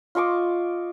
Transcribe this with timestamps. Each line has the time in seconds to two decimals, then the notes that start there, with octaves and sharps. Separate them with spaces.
0.15 F4 D#5 C#6 D6